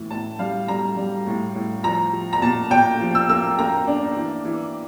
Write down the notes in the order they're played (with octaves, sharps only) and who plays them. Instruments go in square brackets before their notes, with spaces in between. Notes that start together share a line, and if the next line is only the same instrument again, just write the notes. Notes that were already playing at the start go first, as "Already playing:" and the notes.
Already playing: [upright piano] A2 E3
A2 A5
G3 F5
G3 A#5
G3
A2
A2
F3 A#5
F3
A#5
A#2 A5
A#2 G5
F3
E6
A#3 E6
A#3 A#5
D4
E3
E3